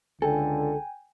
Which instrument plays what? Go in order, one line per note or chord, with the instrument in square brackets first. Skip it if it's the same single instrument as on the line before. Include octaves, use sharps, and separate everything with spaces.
[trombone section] C#2 D3 [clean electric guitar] A4 [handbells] G5 G#5